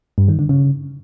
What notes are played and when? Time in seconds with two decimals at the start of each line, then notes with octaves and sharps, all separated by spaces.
0.18 G2
0.28 D#3
0.39 D3
0.49 C#3